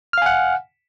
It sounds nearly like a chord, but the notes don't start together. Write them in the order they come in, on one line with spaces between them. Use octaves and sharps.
F6 F5 G#5 F#5